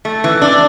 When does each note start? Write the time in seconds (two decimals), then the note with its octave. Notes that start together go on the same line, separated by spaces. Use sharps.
0.05 A3
0.24 E3
0.42 D4